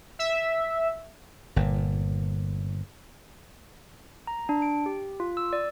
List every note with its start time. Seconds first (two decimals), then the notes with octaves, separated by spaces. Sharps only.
0.19 E5
1.56 G1 A#2
4.27 A#5
4.49 D4
4.62 D7
4.86 G4
5.20 F4
5.37 E6
5.53 D5